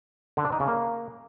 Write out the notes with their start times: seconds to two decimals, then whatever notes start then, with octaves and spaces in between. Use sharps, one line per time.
0.37 D3
0.45 D4
0.52 D#4
0.60 C#3
0.68 A#3